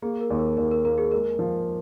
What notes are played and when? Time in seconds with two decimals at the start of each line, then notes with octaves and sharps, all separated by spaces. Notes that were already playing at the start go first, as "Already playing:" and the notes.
0.02 A#3 G#4
0.21 A#4
0.30 D#2
0.39 A#4
0.57 D#2 A#4
0.71 A#4
0.85 A#3 A#4
0.98 G#4
1.11 G#3 A#4
1.39 F3